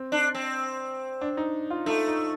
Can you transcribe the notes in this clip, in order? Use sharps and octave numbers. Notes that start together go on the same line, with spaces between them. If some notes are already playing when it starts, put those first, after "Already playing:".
Already playing: C4
D4
C4
D4
D#4
F4
A3 D#4
D#4